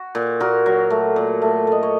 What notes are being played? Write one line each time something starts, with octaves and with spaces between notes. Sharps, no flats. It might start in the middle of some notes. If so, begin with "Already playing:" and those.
Already playing: F#4
A#2
A#2 F#4 A#4
F#3
A3
A#2
A3
A3 D#5
C#5